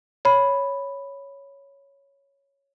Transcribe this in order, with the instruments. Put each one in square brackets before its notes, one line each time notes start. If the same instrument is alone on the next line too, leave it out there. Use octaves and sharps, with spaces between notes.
[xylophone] C#5 B5